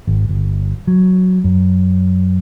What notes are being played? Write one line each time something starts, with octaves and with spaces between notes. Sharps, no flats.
G#1
G1
F#3
F#2